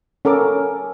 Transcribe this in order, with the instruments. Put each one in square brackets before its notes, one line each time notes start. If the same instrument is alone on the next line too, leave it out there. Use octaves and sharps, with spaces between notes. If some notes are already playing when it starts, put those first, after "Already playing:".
[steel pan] C#4 A4 A#4 D6